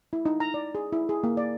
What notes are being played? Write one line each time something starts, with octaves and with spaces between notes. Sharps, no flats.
E4
D#4
A#5
D5
G#4
E4
G#4
A#3
D5